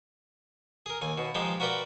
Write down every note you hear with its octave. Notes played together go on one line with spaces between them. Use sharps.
G#4 A#4
D#2 G#5
B2
F3 G#3 D#4 G4
F#4 A#4 B4 D5 G5